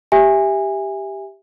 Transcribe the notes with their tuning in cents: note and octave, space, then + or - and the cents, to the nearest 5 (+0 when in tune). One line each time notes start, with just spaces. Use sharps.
G4 +0 E5 +0 G#5 -20